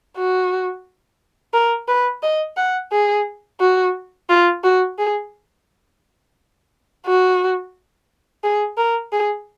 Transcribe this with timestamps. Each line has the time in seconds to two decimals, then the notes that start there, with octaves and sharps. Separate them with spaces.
0.17 F#4
1.53 A#4
1.88 B4
2.23 D#5
2.57 F#5
2.92 G#4
3.60 F#4
4.30 F4
4.64 F#4
4.99 G#4
7.06 F#4
8.43 G#4
8.77 A#4
9.12 G#4